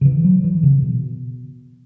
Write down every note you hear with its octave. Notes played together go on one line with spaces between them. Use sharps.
C#3
E3
F#3
E3
C#3
B2